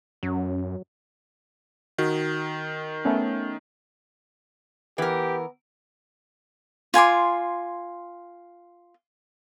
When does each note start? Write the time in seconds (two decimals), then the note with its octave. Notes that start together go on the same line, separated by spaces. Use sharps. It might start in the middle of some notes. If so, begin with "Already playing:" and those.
0.23 F#2 F#3 C#4
1.98 D#3 F#4
3.05 A3 B3 C#4
4.98 E3 B3 G4 A#4
6.94 F4 G#5 C6 D6